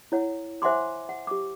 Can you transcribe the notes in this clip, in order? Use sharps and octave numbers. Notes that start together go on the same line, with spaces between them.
E4 C#5 F#5
C5 E5 F#5 G#5 C6 D6
F#5
G4 D6